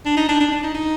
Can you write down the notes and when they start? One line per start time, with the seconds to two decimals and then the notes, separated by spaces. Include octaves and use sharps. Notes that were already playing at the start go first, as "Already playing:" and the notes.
0.05 D4
0.17 D#4
0.29 D4
0.40 D4
0.51 D4
0.63 D#4
0.74 D#4